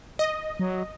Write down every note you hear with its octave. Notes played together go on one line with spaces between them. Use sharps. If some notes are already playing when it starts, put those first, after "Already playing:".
D#5
F#3